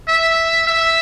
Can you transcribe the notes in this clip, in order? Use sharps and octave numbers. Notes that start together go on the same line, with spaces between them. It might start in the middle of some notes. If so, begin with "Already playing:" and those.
E5
E5